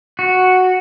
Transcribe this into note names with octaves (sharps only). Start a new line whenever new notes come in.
F#4